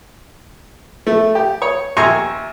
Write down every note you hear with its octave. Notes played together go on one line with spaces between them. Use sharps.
A3
G4
C#5
D#2 E5 G#5 A#5 C6 C#6